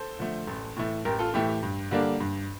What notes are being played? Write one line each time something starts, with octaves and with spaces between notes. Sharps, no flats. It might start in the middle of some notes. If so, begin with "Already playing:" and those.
Already playing: A4 C5
D3 F3 A3
A1
A2 E3 A3
A1 G4 A#4
F4 A4
A2 E3 A3 G4
G4
G2
D3 G3 A#3 D4
G2